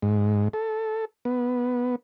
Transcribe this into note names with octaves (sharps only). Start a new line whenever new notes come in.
G#2
A4
B3